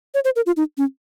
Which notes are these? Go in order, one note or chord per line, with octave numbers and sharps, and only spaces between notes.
C#5
C5
A#4
F4
D#4
C#4